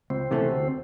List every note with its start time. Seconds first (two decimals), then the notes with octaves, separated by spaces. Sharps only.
0.10 C#2 C4
0.31 C3 E3 A3 C#4
0.51 D2